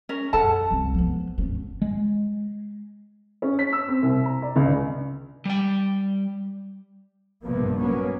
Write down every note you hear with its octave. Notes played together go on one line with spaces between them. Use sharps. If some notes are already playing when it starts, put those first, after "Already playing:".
C#4 A#4
F#2 A4 F#5 A5
C2
F3 B3
C#4 D4
G#3
C#4
B6
E6
C4
C2
A#5
D5
C#2
G3 G5
A#1 G2 C3 F3 A#3 B3
F#3 A#3 B3 C#4